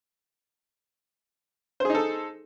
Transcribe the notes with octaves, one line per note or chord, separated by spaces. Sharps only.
D#4 G#4 A4 C5